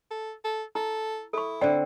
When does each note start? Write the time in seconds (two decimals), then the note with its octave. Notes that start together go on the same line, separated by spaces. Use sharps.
0.11 A4
0.44 A4
0.75 E4 A4
1.33 E4 A4 C#6
1.61 D3 C4 D5 G5